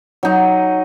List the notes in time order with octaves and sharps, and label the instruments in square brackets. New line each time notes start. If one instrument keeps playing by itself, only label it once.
[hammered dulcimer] F#3 D#4